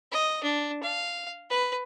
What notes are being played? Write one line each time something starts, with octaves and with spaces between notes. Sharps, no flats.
D#5
D4
F5
B4